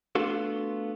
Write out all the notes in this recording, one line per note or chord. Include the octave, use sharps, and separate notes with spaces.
A3 B3 D4 F4 F#4 A4